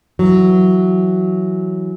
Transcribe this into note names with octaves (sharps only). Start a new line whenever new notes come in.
E3 F#3